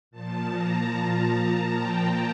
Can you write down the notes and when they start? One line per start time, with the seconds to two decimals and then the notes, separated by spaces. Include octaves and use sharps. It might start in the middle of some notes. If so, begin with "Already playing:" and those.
0.11 A#2 F3 A5
0.51 A#5
0.93 A5
1.74 G5